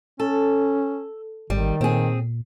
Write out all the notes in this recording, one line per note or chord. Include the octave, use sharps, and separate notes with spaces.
C#4 A4
G#1 D#3 G3
A#2 C4 G#4